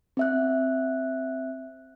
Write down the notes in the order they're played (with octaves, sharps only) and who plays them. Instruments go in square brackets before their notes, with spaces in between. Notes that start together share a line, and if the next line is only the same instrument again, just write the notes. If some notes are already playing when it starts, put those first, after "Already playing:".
[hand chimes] C4 E5 F#6